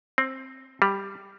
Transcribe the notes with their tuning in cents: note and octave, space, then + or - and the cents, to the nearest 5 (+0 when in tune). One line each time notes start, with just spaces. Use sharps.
C4 +15
G3 +5